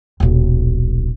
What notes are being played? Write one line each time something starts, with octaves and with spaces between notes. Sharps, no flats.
D#1 B1